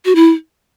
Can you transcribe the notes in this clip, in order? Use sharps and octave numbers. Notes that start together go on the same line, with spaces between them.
F#4
E4